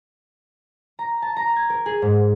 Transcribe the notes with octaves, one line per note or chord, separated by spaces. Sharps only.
A#5
A5
A#5
G#6
A#4
G#4
G#2